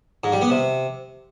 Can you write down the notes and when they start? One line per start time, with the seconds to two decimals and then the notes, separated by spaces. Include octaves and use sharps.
0.24 G#2
0.33 G3
0.41 B3
0.50 C3